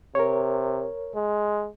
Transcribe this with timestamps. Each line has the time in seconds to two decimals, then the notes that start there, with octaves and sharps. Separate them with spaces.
0.15 C3 A#4 C#5
1.16 G#3